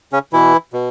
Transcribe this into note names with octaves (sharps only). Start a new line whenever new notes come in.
C#3 C#4
B2 E3 E4
B2